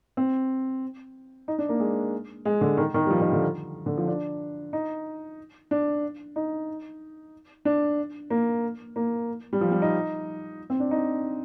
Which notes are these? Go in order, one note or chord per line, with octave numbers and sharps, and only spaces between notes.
C4
D#4
D4
A#3
G#3
G#3
D3
D#3
D#3
G3
F3
D#3
D3
D3
F3
D4
D#4
D4
D#4
D4
A#3
A#3
G3
F3
G3
D#4
C4
D4
D#4